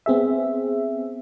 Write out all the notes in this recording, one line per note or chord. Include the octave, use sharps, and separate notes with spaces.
B3 C4 G#4 E5